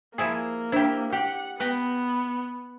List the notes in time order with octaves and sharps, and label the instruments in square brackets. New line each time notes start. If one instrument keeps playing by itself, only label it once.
[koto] F3 E4 G#4 [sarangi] A#3
[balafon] D4 C5 [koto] E4 G4
[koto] G4 [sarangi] F#5
[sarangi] B3 [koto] B4 G5 A#5